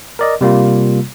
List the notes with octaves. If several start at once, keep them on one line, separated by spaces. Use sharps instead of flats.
A#4 D5 D#5
C3 G3 A#3 F4